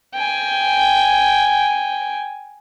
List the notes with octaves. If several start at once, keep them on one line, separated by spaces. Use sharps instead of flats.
G5 G#5